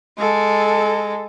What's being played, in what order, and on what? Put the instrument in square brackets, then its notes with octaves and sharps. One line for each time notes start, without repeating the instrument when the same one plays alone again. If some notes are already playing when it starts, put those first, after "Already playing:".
[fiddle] G#3 [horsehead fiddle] A4